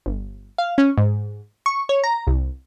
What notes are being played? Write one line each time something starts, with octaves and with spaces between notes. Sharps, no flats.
G1
F5
C#4
G#2
C#6
C#5
A#5
C2